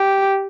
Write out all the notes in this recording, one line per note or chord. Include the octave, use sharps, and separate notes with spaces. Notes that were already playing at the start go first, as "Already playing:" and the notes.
Already playing: G4